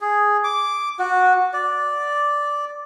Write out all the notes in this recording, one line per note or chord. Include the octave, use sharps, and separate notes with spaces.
G#4
D6
F#4
D5